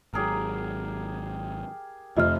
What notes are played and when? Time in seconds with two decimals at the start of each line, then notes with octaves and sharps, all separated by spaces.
0.14 G#1 F#3 G4 G#4 A#4
2.17 F1 F2 F4 D#5 E5 F6